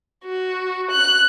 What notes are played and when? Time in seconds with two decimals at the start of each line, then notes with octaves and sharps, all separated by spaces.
0.24 F#4
0.91 F#6